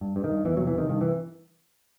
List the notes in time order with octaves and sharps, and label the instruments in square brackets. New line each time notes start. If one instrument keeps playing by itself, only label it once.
[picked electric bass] G2
G2
D#3
G2
E2 E3
C3 F#3
E3
C3 D#3
G2 D#3
E3